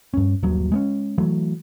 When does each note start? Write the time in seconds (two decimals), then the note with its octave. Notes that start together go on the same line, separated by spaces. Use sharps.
0.14 G2 C#4
0.43 D#1 A#1 G2 F#3
0.72 G#3 B3 C#4
1.18 E3 F#3 A3